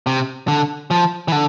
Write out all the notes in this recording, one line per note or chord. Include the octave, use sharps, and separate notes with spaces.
C3
D3
F3
E3
D3